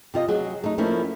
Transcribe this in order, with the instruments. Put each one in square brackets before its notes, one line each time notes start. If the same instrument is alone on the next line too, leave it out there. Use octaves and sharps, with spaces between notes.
[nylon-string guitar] C3 F4 D#5
F#3 G#4
A3 D#4
F3 A3 A#3 C#4 E4